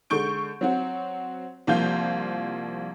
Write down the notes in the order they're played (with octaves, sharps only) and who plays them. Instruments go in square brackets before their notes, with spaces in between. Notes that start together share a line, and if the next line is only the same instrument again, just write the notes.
[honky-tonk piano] D3 G#3 C#6 G6 D7
F#3 C4 F#4
C2 F3 A#3 F5 G6